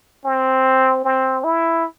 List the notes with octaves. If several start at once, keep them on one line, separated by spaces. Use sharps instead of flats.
C4
C4
E4